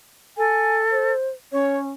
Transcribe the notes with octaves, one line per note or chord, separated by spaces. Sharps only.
A4 G#5
C5
C#4 C#5